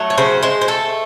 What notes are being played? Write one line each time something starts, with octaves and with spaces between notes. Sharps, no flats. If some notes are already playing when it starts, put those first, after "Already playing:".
Already playing: F#3 A3
C#5
C#3 C5
G#3 C5
C5
A3 A4